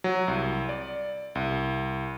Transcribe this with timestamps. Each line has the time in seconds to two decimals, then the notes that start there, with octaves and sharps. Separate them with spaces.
0.04 F#3
0.28 C2
0.69 D5
1.35 C2